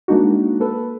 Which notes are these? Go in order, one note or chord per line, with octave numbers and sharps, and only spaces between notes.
G#3 A#3 D4 D#4 F#4
A#3 A4 B4